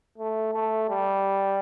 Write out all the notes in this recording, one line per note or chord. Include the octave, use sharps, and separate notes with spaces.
A3
A3
G3